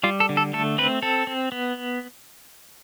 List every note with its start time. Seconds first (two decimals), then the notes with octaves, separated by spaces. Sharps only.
0.04 G3 F4
0.20 A4
0.29 D3
0.37 A4
0.53 A3 A4
0.78 C4 B4
1.02 C4 A4
1.27 C4
1.52 B3